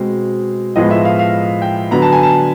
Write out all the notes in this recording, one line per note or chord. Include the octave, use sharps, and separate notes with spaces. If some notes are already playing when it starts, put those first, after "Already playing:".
Already playing: B2 G#3 C4
A2 F3 G#3 B3 D#5
E5
F5
F5
G5
D3 F#3 B3 A#5
A5
G#5
A5